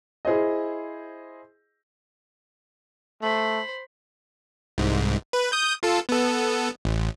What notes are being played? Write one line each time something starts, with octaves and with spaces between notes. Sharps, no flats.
E4 G#4 C5 D#5
A3 C5 B5
C2 G#2
B4
D#6 G6
F4 A4
B3 A4
A1